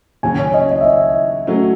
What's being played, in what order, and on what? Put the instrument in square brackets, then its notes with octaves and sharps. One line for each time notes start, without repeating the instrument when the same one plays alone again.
[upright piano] D#2 C#3 F#3 C#4 F#4 [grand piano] G#5
[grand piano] C#5
D#5
D#5
E5
D#5
[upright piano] F#3 A3 C#4